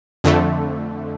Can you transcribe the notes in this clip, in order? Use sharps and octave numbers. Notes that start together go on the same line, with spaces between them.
F2 D3 A3